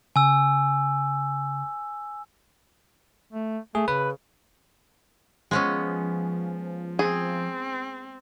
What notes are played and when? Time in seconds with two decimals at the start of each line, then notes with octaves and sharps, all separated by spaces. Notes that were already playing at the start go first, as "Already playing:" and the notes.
0.16 C#3 G#5 E6
3.33 A3
3.75 A3 G#4
3.88 C#3 B4
5.51 F3 G#3 B3 C#4
6.99 C4 G#4